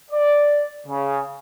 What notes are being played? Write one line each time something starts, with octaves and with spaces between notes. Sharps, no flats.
D5
C#3